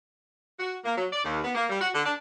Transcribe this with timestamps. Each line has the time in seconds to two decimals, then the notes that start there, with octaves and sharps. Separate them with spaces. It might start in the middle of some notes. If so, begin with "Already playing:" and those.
0.59 F#4
0.85 A#3
0.97 F#3
1.12 D5
1.24 D#2
1.43 B3
1.55 A#3
1.69 G3
1.81 F#4
1.94 D3
2.05 D4